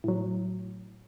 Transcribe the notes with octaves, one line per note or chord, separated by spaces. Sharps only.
A2 F#3